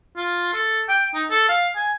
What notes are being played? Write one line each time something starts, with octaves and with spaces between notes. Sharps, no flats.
F4
A4
G5
D#4
A4
F5
G#5